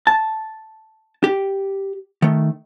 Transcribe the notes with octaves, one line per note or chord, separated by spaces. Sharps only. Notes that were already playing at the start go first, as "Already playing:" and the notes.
A5
G4
D#3 A3